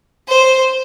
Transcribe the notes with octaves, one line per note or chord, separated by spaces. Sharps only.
C5